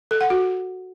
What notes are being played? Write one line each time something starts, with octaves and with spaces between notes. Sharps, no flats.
A4
F#5
F#4